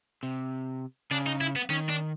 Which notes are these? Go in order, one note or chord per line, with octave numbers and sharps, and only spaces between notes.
C3
C#3 D4
D#4
E4
B3
D#3 C#4
D4